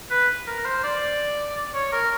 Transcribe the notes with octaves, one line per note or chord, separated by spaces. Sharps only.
B4
A#4
C5
D5
C#5
A#4